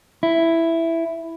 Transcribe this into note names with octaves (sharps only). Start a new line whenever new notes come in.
E4